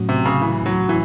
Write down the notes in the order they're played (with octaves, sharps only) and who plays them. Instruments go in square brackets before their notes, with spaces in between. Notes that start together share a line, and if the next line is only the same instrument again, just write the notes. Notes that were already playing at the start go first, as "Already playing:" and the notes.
Already playing: [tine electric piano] A2 F#3 A3 C#4 F#4
[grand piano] C3
C#3
E3
F#3
E3